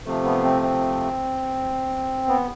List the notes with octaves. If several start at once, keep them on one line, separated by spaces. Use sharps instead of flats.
C3 F3 A3
B3
C4
C4
B3